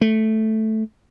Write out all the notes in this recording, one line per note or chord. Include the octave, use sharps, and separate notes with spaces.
A3